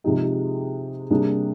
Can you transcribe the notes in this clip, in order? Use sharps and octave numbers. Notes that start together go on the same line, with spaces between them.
C3 F3 G#3 D#4 G4
G#4
G4
C3 G3 A#3 D4 G#4